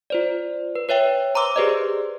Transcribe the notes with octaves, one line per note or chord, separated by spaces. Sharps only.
F4 C5 D5
B4
B4 C#5 E5 G5
C5 A#5 C6 D6 E6
G4 G#4 B4 C5 D5 D#5